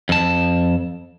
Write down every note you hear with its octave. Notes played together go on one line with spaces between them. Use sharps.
F2 A5